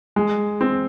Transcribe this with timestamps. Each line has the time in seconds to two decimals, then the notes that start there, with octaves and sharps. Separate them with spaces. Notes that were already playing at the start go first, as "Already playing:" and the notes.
0.16 G#3
0.61 C4